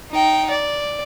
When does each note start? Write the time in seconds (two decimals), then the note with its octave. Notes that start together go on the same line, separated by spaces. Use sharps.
0.12 D#4 G5
0.50 D5